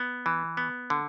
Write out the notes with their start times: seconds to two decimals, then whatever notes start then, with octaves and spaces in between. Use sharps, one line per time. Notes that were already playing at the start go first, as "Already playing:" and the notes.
Already playing: B3
0.26 E3
0.57 B3
0.90 D3